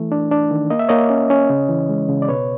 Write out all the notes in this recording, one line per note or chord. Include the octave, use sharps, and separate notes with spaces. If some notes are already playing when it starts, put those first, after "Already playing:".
Already playing: E3 A3
D4
D4
D#3
A#3 D#5
E5
A#3 C#5 D#5
C#4
C#4
C#3
E3
G#3
C#3
D5
B2 B4 C#5